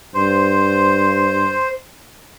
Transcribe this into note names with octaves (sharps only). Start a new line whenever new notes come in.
G2 C5